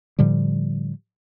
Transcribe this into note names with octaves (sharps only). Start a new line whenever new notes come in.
A2 D3 F3 G3